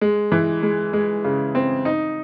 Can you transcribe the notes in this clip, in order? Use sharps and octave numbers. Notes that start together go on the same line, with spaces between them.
G#3
E3
G#3
G#3
C#3
C4
D#4